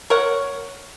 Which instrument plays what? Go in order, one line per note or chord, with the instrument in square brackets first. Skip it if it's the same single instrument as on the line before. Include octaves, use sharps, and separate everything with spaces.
[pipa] A#4 C#5 F#5